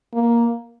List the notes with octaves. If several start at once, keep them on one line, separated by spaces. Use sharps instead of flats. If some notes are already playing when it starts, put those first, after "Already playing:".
A#3